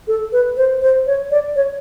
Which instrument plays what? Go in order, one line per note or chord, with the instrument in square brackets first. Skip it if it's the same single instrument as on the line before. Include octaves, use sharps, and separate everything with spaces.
[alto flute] A4
B4
C5
C5
C#5
D5
C#5